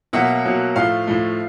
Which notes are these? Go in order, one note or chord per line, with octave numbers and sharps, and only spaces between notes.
B2 F#3 A#3 E5 F#5
B2 F#3 A#3
A2 F3 A3 F5
A2 F3 A3